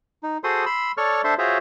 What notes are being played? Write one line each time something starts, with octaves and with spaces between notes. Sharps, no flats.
D#4
F#4 G#4 A4 C5 C6 D#6
B5 C6 E6
A4 C#5 D5 C#6 F6
D4 A4 C5 E5 C6
F4 F#4 G#4 C5 C#5 E5